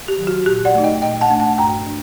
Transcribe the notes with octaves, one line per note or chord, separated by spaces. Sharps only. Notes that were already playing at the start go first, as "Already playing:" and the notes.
G4
D#3 F#3
F#4
A#2 G4
D5 F#5
A3 D#4
D#5 G5
A#2 D#5 G5
F#5 A5
A3 D4
F#5 A5
G2 G5 A#5
D4